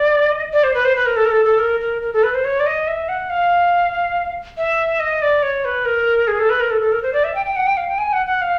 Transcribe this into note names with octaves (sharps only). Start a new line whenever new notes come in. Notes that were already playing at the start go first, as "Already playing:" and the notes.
Already playing: D5
D#5
D5
C5
B4
C5
B4
A#4
A4
A#4
A4
A4
A#4
A#4
A#4
A4
B4
C5
C#5
D5
D#5
E5
F#5
F5
E5
D#5
D5
C#5
B4
A#4
G#4
A4
B4
A#4
A4
A4
A#4
C5
D5
E5
G5
G5
F#5
G5
F5
G5
G#5
F#5
F#5
F5